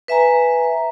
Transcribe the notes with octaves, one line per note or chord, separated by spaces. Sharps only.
B4 E5 G#5 A#5